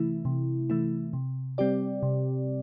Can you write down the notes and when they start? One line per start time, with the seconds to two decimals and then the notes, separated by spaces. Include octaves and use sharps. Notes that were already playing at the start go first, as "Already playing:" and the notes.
Already playing: C3 E3 A3 E4
0.25 C3
0.70 E3 A3 E4
1.13 C3
1.58 G3 C4 G4 D5
2.03 C3